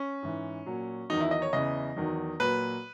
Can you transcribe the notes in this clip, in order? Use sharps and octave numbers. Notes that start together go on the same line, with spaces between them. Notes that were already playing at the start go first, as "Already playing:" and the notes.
Already playing: C#4
G#2 E3
A#2 F#3
E2 D#3 F#3 D#4
E4
D#5
C#5
E2 C#3 E3 D#5
E2 D#3 F#3
A#2 F#3 B4